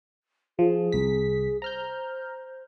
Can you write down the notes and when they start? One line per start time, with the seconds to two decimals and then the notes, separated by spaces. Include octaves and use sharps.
0.59 F3 G#4
0.92 C2 B6
1.62 C5 A#5 F6 G6